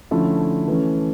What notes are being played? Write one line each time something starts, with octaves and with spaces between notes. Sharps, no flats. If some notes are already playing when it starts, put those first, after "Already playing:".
D3 F3 A3 C#4 E4
E3 A3 C#4